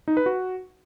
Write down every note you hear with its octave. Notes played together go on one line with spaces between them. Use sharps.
D#4
B4
F#4